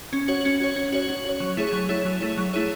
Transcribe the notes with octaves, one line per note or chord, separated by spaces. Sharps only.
C#4
F#4 C#5
C#4
F#4 C#5
C#4
F#4 C#5
C#4
F#4 C#5
F#3
A3 E4 G#4 C#5
F#3
A3 E4 G#4 C#5
F#3
A3 E4 G#4 C#5
F#3
A3 E4 G#4 C#5